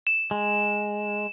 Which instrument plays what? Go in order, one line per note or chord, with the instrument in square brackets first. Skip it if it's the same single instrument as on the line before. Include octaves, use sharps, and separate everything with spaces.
[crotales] E7
[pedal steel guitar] G#3